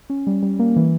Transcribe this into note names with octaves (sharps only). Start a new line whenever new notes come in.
C#4
G3
G3
A#3
E3